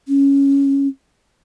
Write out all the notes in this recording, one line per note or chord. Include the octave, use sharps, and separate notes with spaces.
C#4